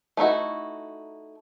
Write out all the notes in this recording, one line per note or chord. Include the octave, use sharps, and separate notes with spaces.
A3 D#4 E4 F#4